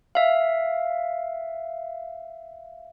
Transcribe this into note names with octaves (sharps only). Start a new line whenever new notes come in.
E5 F5